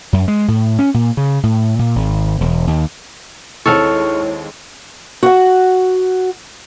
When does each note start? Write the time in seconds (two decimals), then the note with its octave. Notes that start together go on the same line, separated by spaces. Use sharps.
0.13 F#2
0.28 G#3
0.48 A2
0.79 C#4
0.94 A#2
1.17 C#3
1.43 A2
1.79 A#2
1.96 G#1
2.41 E1
2.67 D#2
3.66 D#2 G#3 C4 E4 A4 C#5 C#6 F6
5.23 F#4 F#5